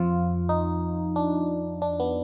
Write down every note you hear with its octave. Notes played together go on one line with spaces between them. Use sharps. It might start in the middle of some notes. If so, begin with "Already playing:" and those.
Already playing: F2 F3 F4
D#4
D4
D4
B3